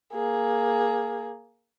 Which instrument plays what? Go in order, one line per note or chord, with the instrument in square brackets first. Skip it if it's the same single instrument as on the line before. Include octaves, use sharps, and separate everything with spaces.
[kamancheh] A#3 G#4